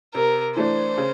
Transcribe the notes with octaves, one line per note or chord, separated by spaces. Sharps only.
C3 A#4
E3 A3 D4 C5
C#3